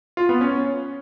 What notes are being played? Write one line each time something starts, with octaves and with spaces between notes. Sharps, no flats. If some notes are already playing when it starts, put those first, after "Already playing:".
F4
B3
C#4